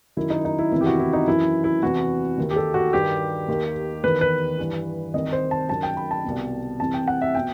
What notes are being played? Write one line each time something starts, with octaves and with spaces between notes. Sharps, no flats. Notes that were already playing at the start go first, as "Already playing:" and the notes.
F#2 D#3 E4
D#4
D#4
E4
E2 C3 D#3 E4
G4
F#4
E4
D#4
F#2 E3 E4
E4
E2 C3 E3 F#4
D#2 D#3
G4
A4
F#4
G2 D#3 G4
D#2 D#3
E2 D#3 B4
B4
G2 E3
C2 C3 D#3 D#5
C5
A5
F#2 D#3 A5
G5
B5
A5
C2 B2
C2 C3 E3 A5
G5
F#5
E5
B2 G5